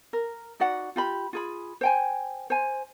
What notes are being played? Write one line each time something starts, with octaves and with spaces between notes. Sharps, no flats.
A#4
D#4 F#4 D5 F#5
F4 G4 B5
F4 G#4 B5
C5 G5 G#5
C5 G#5